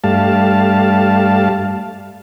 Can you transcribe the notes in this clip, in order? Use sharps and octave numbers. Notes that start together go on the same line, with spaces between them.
G2 G3 A3 F5 A5